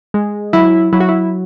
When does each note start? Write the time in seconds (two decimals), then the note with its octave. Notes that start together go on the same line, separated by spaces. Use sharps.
0.14 G#3
0.53 F#3 E4
0.93 F#3 E4
1.00 F#4
1.09 E4